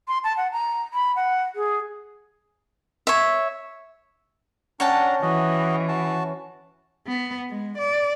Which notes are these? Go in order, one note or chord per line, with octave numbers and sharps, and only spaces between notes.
C6
A5
F#5
A#5
B5
F#5
G#4
C#5 E5
C#4 D4 F#5 G5 A5 A#5
E3 F#4 D#5
F#4 A5
B3
G#3
D5